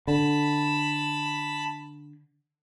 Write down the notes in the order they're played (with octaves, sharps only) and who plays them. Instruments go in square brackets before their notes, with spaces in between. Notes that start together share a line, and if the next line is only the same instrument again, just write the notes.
[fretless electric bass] D3 [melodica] A5 B5